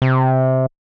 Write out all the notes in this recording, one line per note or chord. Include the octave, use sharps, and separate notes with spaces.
C3